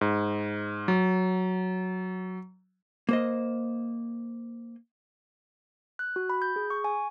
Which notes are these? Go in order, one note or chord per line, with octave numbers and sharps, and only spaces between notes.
G#2
F#3
A#3 C5 D#5
F#6
F#4
B5
G6
G#4
C#6
G#5